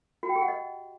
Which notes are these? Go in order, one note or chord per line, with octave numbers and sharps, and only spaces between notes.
F#4
G5
G4
F#5
D#5